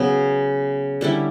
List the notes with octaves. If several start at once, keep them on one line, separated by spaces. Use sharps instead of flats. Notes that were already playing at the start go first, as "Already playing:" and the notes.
Already playing: C#3 F#3 B3
D3 G3 C#4 E4